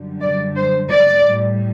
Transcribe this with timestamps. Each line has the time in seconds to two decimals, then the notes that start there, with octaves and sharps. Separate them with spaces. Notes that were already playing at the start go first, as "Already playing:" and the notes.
Already playing: F#2 D3 G3
0.21 D5
0.56 C5
0.91 D5
1.25 A2 G3